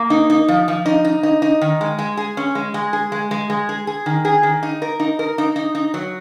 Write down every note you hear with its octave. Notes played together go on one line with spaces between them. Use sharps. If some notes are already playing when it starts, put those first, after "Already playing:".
Already playing: A#3
D#4
D#4
F3
F3
D#4
D#4
D#4
D#4
D#3
G#3
G#3
G#4
C#4
G#3
G#3
G#4
G#3
G#3
G#3
G#4
G#4
D#3
G#4
D#3
D#4
A#4
D#4
A#4
D#4
D#4
D#4
F#3